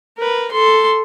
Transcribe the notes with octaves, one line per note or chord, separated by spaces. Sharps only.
A#4 B4
A4 C6